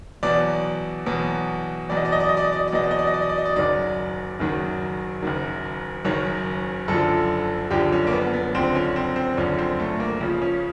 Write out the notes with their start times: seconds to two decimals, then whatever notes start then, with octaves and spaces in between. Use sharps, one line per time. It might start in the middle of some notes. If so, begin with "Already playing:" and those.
0.23 E2 B2 F#3 D5
1.06 E2 B2 F#3
1.89 E2 B2 F#3 D5
1.97 D#5
2.05 D5
2.12 D#5
2.20 D5
2.29 D#5
2.37 D5
2.44 D#5
2.52 D5
2.59 D#5
2.68 D5
2.72 E2 B2 F#3 D#5
2.83 D5
2.91 D#5
2.99 D5
3.07 D#5
3.14 D5
3.22 D#5
3.29 D5
3.38 D#5
3.45 D5
3.56 F#1 F#2 D#3 F#3 D5
4.39 F#1 F#2 D#3 F#3
5.22 F#1 F#2 D#3 F#3
6.04 F#1 F#2 D#3 F#3 C#5
6.88 F#1 F#2 D3 F3 A4
7.71 F#1 F#2 D3 F3 G4
7.92 C#4
8.07 A#3
8.13 B3
8.33 B3
8.54 F#1 F#2 D3 F3 C4
8.75 C#4
8.96 C4
9.16 C4
9.37 F#1 F#2 D3 F3 C#4
9.59 C4
9.79 A3
10.00 A#3
10.21 C#2 C#3 F3
10.42 C#4